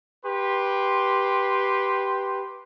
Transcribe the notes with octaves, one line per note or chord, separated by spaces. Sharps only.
G4 B4 C6